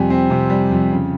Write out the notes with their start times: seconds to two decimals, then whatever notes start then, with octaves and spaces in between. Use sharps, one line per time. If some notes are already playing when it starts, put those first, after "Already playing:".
Already playing: F2 C3 G3 C4 G#5
0.10 C4
0.30 C3
0.50 G3
0.71 F2
0.91 C#3